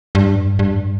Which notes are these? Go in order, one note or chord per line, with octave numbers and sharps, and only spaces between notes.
G2
G2